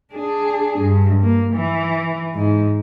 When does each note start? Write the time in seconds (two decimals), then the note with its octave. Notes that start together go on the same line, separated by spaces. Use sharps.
0.14 D4 G#4
0.79 G2
1.23 A#3
1.53 E3
2.35 G#2